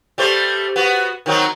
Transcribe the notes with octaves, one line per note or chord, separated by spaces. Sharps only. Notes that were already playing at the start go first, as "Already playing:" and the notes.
G3 A3 C5
B3 F#4
D#3 F#3 C4